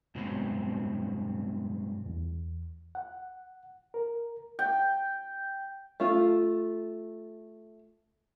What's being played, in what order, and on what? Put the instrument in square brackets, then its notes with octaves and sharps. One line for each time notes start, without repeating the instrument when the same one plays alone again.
[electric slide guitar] G2 B2 F#3 G#3 B3 C4
[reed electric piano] E2
F#5
A#4
[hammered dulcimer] G5
[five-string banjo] A3 F4